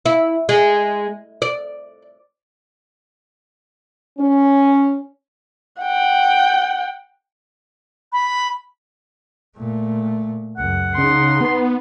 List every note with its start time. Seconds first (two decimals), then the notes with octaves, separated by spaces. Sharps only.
0.06 E4
0.49 G#3
1.42 D5
4.19 C#4
5.81 F#5 G5
8.13 B5
9.57 A#2 A3
10.58 C#2 F#2 F#5
10.98 C#3 D#4 C6
11.41 B3